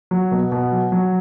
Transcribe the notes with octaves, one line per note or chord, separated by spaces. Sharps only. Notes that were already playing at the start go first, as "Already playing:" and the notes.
F#3
B2
B2
F#3
F#3